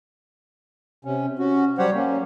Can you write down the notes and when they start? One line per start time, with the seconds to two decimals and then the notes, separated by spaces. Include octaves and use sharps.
1.05 C3 C#4
1.39 C#4 F#4
1.78 F#3 G3 G4 C5 C#5 F#5
1.94 F#3 A#3 C#4